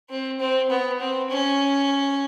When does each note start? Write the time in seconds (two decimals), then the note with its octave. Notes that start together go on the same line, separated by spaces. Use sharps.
0.10 C4
0.39 C4
0.70 B3
1.00 C4
1.30 C#4